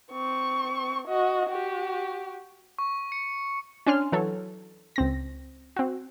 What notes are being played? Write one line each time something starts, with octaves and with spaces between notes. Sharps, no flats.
C4 C#6
F#4 D#5
F#4 G4
C#6
C#7
C#4 D4 G#5 C6 F6
E3 F#3 A4 C#5
C#2 C4 A#6
C4 F#4